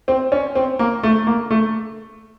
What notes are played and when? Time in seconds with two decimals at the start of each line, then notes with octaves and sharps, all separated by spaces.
0.08 C4
0.32 C#4
0.55 C4
0.79 A#3
1.03 A3
1.27 A#3
1.51 A3